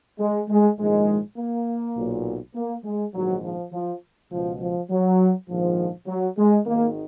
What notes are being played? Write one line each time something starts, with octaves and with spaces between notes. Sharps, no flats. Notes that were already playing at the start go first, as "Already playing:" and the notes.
G#3
G#3
A#1 G#2 D#3 G#3
A#3
B1 A#2
A#3
G#3
A#1 G#2 D#3 F#3
F3
F3
C#2 B2 F3
F3
F#3
A#1 G#2 D#3 F3
F#3
G#3
G#1 G#2 D#3 A#3